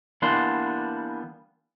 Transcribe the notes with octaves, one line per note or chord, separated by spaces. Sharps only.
E3 G3 A#3 B3 D4 C6